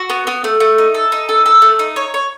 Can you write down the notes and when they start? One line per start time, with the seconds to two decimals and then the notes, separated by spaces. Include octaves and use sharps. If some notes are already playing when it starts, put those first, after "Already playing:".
Already playing: F#4
0.10 B3
0.27 B3
0.44 A3
0.60 A3
0.78 D#4
0.94 A4
1.12 D#4
1.29 A4
1.46 A4
1.62 A3
1.79 D#4
1.96 C#5
2.14 C#5